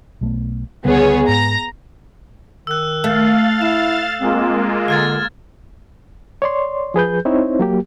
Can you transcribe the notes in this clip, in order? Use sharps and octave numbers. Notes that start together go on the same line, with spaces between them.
B1 A3 B3
C#2 D3 G3 B3 G#4 C#5
G#2 A#5
D#3 E6 F#6
A3 F5 A6
E4 E7
G#3 A#3 C4 F4
D3 F6 G#6 A6
C#5 D5 C6
F3 G#4 B4 G6
C4 D#4 E4 C5 C#5
F#3 A#3 G4